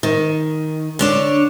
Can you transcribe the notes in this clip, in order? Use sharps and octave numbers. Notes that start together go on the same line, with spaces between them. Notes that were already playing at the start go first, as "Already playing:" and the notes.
D#3
D3 D4 C#5